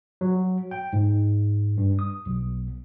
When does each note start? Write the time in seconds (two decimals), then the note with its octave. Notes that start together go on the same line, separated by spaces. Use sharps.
0.21 F#3
0.71 G5
0.93 G#2
1.77 G2
1.99 D#6
2.26 B1